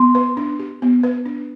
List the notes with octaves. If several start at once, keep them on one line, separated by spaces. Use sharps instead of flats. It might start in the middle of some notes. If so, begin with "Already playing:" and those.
Already playing: B3 C6
B4
D4
G4
B3
B4
D4